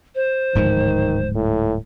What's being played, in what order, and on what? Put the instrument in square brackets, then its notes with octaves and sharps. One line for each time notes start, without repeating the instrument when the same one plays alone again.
[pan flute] C5
[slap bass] D1 G#2 F3 [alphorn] D#3
[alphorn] A2